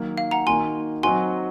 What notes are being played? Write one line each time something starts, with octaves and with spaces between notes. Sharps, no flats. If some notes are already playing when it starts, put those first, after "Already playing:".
Already playing: D#3 F#3 A#3
F5
F#5 A#5
D#3 A#3 D#4 F#4 G#5 C6
F#3 C4 D#4 F#4 G#5 C6